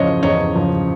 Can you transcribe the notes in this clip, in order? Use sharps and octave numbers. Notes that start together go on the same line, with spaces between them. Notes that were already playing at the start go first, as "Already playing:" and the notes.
Already playing: E2 C#3 F3 C5 C#5 D#5
E2 C#5 D#5
C#3 F3